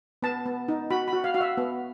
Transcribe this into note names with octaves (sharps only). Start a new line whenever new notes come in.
B3 A5
B3
D#4
F#4 B5
B5
F#4
F5
F#4 F5
E5
B3